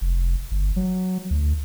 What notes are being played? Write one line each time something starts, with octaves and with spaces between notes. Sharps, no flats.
F1
G1
F#3
D2